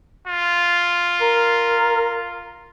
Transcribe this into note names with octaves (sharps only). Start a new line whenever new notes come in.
F4
A#4